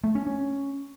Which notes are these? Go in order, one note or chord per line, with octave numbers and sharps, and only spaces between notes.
A3
C#4
C#4